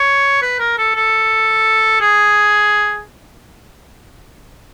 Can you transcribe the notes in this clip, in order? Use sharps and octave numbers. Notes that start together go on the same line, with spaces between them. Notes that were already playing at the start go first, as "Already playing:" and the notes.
Already playing: C#5
B4
A#4
A4
A4
G#4